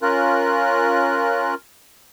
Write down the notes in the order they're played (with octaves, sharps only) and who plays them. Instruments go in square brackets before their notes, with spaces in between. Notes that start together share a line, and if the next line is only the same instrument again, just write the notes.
[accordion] C#4 F4 A#4 F#6